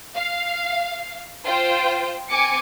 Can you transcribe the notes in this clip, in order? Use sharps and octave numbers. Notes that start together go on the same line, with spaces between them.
F5
F4 C5 G5
C4 G#5 D6 C#7